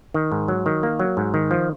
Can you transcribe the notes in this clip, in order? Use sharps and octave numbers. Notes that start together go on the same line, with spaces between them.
D#3
G#2
F#3
D#3
A#3
F#3
G#2
D#3
F3